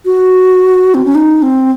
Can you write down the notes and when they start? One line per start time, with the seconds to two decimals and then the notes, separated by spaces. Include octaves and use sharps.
0.05 F#4
0.94 C4
1.05 C#4
1.15 D#4
1.42 C4